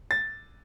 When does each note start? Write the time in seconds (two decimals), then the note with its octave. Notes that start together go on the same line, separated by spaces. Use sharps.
0.11 A6